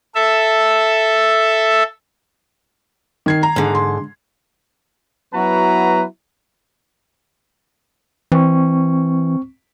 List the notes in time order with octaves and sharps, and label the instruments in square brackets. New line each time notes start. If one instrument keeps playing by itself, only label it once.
[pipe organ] A4 E5
[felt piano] D#3 G#6 C7
A#5
[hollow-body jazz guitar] G#2 D3
[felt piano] C6
[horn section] F#3 B3 E4 F#4 B4 A#5
[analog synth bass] E3 [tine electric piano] C4 C#6